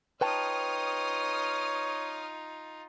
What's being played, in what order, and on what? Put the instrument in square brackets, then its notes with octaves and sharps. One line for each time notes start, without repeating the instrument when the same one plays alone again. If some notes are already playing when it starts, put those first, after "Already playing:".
[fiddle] D#4 F4 [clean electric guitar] B4 G5 A5 [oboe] C#5 [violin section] D#6 F6